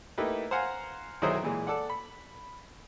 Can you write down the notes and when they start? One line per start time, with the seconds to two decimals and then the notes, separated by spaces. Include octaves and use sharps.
0.18 A3 A#3 D#4 E4 G4 B4
0.51 C5 F5 F#5 G#5 A#5
1.22 B1 D#3 F#3 E4 G#4 C5
1.43 A#2 E3 G#3
1.67 A4 D5 F#5
1.90 B5